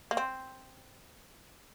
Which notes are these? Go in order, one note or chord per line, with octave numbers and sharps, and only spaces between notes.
A#3
C4